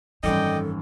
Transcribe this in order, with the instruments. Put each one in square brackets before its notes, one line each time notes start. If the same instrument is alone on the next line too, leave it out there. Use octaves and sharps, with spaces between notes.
[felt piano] G#1 F#2 [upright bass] E3 G3 [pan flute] A4 [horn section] D5 D#5 G5